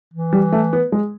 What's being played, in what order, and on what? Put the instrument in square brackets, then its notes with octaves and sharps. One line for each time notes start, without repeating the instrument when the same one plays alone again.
[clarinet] E3
[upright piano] G3
A3
B3
G#3